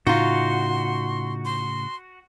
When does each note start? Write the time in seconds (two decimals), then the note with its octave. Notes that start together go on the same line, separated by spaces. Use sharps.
0.07 A2 C#3 D#4 F4 F#4 C6
1.45 C6